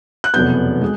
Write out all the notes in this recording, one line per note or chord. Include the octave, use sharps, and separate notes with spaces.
F#6
F1 E2 B2 F#3 B3 G6
G#3